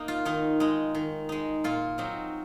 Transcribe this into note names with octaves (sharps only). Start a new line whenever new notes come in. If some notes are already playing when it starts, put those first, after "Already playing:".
Already playing: A#3 D#4 A#4
F4
D#3 D#4
G#3 D#4
D#3
G#3 D#4
A#2 F4
F#3 C4 D#4